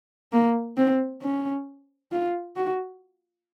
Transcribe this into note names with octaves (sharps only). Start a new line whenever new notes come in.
A#3
C4
C#4
F4
F#4